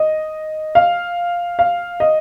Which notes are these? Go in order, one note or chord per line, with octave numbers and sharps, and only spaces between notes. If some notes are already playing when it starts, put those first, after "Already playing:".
Already playing: D#5
F5
F5
D#5